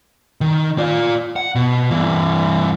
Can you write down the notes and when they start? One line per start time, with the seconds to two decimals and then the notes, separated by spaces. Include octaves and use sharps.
0.41 D#3
0.78 F4 D5
1.36 F#5
1.55 B2
1.90 G2 E3